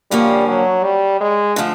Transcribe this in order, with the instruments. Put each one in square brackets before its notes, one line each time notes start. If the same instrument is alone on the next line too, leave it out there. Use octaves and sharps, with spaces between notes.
[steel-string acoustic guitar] D3 F3 A#3 C#4 [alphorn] G3
[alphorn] F#3
G3
G#3
[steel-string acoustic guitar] D3 F3 A3